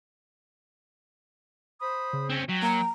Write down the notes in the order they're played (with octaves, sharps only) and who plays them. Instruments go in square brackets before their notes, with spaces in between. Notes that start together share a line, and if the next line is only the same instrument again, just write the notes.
[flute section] C5 B5 D#6
[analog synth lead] C#3
[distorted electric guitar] C4 C#4
[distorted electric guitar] F#3 [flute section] G5 [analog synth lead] B6
[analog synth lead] A#3 [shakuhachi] A#5